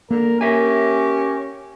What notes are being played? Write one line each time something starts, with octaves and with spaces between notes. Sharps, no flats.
D3 A#3 A#4
C#4 G4 A#4 E5 G#5